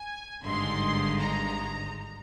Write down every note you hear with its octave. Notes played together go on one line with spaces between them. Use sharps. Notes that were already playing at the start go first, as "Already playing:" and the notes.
Already playing: G#5
G#1 G2 D3 G#3 D#4 C6
A#5